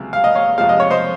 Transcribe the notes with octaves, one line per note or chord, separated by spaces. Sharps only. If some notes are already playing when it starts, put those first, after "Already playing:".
Already playing: C#2 C3 F#3
F5
D#5
C#5 F5
F2 C3 F3 G#3 F5
D#5
C#5
C5 D#5